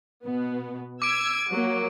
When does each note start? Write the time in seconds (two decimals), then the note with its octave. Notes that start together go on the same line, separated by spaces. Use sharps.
0.24 B2 B3
1.02 D6 E6 G#6 D7
1.49 F#3 A#3